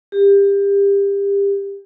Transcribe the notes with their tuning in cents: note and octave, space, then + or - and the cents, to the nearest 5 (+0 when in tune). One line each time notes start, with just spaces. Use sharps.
G4 +25